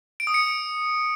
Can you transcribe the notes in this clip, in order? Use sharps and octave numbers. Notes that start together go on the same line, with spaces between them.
D7
D#6
C#7